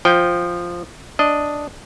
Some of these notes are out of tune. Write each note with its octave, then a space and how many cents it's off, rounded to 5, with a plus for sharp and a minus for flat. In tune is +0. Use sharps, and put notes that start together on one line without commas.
F3 +0 G5 +0
D4 +0 D#5 +0